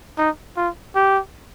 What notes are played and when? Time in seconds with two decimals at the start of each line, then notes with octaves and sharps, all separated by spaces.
0.18 D#4
0.57 F4
0.96 G4